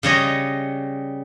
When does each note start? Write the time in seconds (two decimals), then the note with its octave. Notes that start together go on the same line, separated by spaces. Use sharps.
0.03 C#3 G3 C#5 D#5